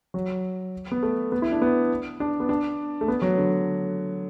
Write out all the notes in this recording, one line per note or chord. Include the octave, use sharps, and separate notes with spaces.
F#3
B3
A3
B3
E4
D4
B3
D4
B3
D4
A3
B3
F#3
D3